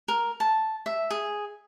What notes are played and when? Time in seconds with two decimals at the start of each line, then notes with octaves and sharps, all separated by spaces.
0.08 A#4
0.40 A5
0.86 E5
1.10 G#4